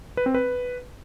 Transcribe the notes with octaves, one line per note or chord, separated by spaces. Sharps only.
B4
C4
B4